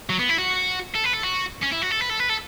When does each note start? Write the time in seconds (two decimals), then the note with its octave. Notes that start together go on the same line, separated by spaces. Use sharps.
0.10 F#3
0.19 B3
0.29 E4
0.38 F#4
0.95 A4
1.05 B4
1.14 A4
1.24 F#4
1.62 C#4
1.72 E4
1.82 F#4
1.90 A4
2.00 B4
2.09 A4
2.19 B4
2.29 A4